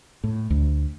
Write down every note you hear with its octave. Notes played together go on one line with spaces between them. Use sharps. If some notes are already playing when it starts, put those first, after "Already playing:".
A2
D2